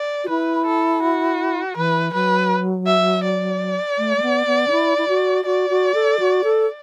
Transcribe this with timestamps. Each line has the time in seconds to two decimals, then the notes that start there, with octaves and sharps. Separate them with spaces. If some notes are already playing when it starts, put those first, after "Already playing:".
Already playing: D5
0.24 F#4
0.29 E4 B4
0.66 A4
1.03 F#4
1.76 E3 B4
2.13 F#3 B4
2.87 E5
3.24 D5
3.98 A3
4.17 A3
4.22 B3
4.47 B3
4.68 D4
4.72 E4
4.98 E4
5.09 F#4
5.45 F#4 D5
5.70 F#4
5.94 A4
6.20 F#4
6.44 A4